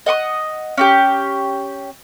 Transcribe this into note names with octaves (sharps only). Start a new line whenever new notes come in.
D#5 F#5 C#6 D#6
C#4 F#4 G4